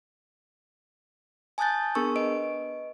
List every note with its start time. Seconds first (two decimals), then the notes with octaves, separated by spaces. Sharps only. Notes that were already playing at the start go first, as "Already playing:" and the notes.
1.58 G#5 A5 D#6 F#6 G6 A6
1.95 B3 D4 G#4 A#4 C#6 E6
2.16 B4 D#5 D7